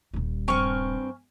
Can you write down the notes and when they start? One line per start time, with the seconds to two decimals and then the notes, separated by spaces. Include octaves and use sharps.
0.14 D#1 G3
0.48 G2 C4 G#5 C#6 F6